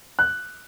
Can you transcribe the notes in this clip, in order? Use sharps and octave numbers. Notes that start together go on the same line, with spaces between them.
F#6